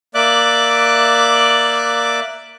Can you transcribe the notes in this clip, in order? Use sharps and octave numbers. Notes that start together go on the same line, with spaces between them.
A#3 D5 E5 D6 F#6